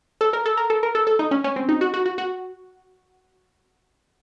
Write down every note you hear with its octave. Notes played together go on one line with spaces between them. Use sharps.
A4
A#4
A4
A#4
A4
A#4
A4
A4
D#4
C#4
C#4
C4
D#4
F#4
F#4
F#4
F#4